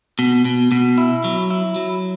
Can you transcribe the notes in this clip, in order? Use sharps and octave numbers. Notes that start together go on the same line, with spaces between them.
B2
B2
B2
E4
F#3
E4
F#3